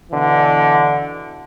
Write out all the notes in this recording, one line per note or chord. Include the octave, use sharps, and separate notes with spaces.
B2 D3 E3